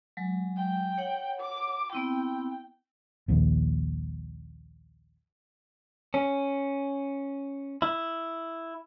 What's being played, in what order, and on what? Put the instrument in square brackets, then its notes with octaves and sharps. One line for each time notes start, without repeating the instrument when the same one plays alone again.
[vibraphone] F#3 G#3
[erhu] G5
[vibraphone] C#5 F#5
[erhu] D6
[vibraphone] B3 C4 E4 [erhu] G5
[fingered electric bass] A#1 D#2
[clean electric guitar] C#4
E4